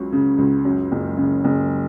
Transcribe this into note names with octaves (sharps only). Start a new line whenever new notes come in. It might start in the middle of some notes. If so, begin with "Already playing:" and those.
Already playing: C#2 C#3 F#3 C#4
C#3
C#2
F#2
F#1
C#3
F#1